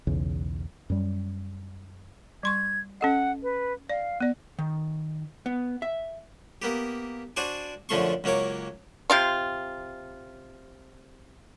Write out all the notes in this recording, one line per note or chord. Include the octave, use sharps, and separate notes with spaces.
B1 E2 C#3
F#2 G3
G3 C6 C#6 G#6
C#4 A4 D#5 F#5
B4
D5 F5
B3 D5
D#3
B3
E5
A#3 B3 G4
D4 F#4 C5 D5 G#5
F#2 D3 F3 A3 C6 C#6
C#2 F#3 A#3 C#5 D6
C3 F4 C6